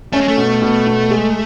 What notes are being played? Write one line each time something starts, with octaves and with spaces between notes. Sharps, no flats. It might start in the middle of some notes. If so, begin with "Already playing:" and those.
A3 C#4
G#3
A3
B2
B2
B2
G#3